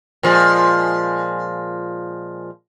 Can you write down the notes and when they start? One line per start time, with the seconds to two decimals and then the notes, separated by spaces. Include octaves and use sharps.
0.23 A#2 F3 G#3